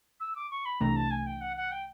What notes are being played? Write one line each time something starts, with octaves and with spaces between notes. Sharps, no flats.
E6
D6
C#6
B5
C2 C3 E3 A3 D4 A#5
A5
G#5
G5
F#5
F#5
G5